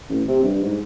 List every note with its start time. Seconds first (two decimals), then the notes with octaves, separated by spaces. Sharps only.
0.10 A1
0.28 C3
0.43 G2
0.62 G#2